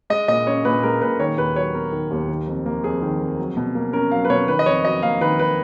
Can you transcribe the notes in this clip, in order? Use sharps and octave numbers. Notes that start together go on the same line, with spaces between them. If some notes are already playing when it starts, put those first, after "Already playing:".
G#3 D#5
A#2 D#5
C#4 C#5
A#2 B4
G#3 A#4
A#2 B4
D#3 C#5
D#2 B4
F#3 C#5
B3 A#4
D#3
D#2
D#3
F2
A#3
F2 G#4
D#3
F2
F#3
B2
A#3
C#4 A#4
F#3 F5
B4
B2 C#5
D#3 B4
D#5
F2 C#5
F#3 D#5
A#3 F5
D#3 B4
B4